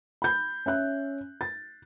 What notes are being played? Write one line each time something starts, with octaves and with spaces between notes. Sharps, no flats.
B5 G6
C#4 E5 F#6
A6